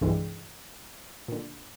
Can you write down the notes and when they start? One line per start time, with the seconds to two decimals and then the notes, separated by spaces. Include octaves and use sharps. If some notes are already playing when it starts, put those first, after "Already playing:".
0.01 C2 G2 D3 E3 G3 G#3
1.28 A#2 D3